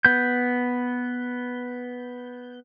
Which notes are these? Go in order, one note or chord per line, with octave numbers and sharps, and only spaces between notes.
B3 G6